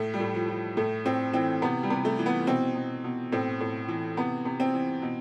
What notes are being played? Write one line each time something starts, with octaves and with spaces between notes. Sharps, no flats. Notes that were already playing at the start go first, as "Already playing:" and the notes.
Already playing: A2 A3
G3
A2
F3
F3
A2 A3
A2 C4
E3 C4
C3 B3
G3
C3
A3
E3
B3
B2 C4
B2
B2
A2 C4
A2
E3
C3 B3
C3
C4
E3
B2